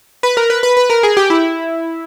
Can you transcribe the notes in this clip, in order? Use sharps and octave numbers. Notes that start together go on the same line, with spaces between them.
B4
A#4
B4
B4
B4
A#4
G#4
G4
E4